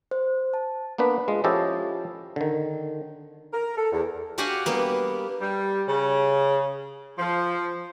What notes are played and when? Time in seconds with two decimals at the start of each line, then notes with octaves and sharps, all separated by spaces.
0.11 C5
0.54 A5
0.98 A#3 B3 D4 B4
1.28 G#3 F4
1.44 F3 C#4 E4 G4 A4 D#5
2.36 D3 D#3
3.53 A#4
3.78 A4
3.92 E2
4.38 D4 F#4 G4 F5 F#5 G#5
4.66 G3 A#3 B3
5.40 G3
5.87 C#3
7.18 F3